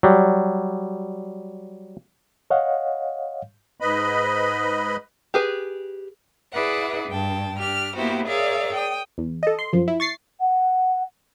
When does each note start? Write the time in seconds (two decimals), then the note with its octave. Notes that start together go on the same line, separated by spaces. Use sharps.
0.03 F#3 G3
2.50 C#5 D#5 F5 F#5
3.80 G#2 B4 D#5 B5
5.34 G4 G#4 B4
6.52 E4 G#4 B4 D5 E5 F#5
7.09 G2 G5 A5
7.58 D4 G4 F6
7.96 A#3 B3 E4 F#4 G4 C5
8.26 G#4 A#4 C#5 D5 E5 F5
8.74 G5 D#6
9.18 E2
9.43 A4 D#5
9.59 C6
9.73 F#2 F3
9.88 E4
10.00 C#6 A6 C7
10.40 F#5